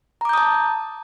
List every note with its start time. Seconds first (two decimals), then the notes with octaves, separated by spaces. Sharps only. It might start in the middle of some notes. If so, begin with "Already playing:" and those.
0.21 A#5
0.25 D6
0.29 G6
0.33 D#6
0.38 A5